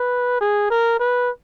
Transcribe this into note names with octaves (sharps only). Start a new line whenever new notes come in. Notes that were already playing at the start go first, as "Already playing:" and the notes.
Already playing: B4
G#4
A#4
B4